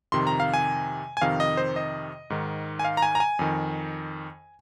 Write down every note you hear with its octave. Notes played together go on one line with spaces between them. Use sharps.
F2 C3 D#3 C6
A#5
F5
G#5
G#5
F2 C3 D#3 F5
D#5
C5
D#5
G#2 D#3
G#5
F5
A#5
G#5
A#5
G#5
F2 D#3